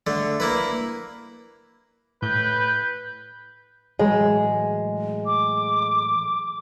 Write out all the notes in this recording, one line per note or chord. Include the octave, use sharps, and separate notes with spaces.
D3 A3
A#3 E4 B4
A2 B4 G6
A2 E3 F#3 G#3
D6